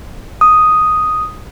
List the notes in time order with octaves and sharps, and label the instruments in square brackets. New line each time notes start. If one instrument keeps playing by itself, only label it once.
[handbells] D#6